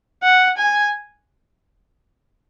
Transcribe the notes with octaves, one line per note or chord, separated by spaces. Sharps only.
F#5
G#5